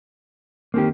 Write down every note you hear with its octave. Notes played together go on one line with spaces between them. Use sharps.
D#3 A#3 C4 G4